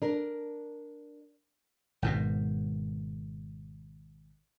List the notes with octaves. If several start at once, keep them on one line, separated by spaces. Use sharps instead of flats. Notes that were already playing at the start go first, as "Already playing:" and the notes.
D4 A#4
G#1 G#2 B2